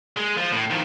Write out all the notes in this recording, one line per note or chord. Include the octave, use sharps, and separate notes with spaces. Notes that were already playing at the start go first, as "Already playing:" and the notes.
G#3
F3
A2
D#3 F3